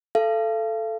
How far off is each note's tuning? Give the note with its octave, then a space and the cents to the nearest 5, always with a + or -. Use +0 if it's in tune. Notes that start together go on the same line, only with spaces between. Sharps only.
A4 +0 F5 -40